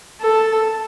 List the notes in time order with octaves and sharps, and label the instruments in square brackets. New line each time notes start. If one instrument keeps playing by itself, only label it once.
[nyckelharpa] A4